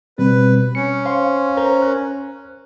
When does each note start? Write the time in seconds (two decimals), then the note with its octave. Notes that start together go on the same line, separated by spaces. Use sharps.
0.18 B2 G3 C4 B4
0.75 C#4 C#7
1.05 C5 F5 C6
1.57 A#4 C5 A#5
1.82 F#6